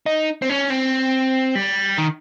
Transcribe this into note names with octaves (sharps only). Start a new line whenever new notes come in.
D#4
C4
C#4
C4
G3
D#3